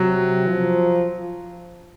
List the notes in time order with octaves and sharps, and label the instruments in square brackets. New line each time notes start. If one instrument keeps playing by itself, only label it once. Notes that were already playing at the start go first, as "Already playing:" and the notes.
Already playing: [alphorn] C3 [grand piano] F#3
[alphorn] F3